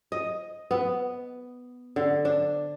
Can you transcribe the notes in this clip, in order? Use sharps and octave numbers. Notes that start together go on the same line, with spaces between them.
D#5
B3
D3
D4